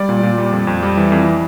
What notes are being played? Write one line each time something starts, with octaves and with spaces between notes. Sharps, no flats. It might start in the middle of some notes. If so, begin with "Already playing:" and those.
Already playing: G3 D5
A#2
A#2
G3
F2
F2
G3
E3
F2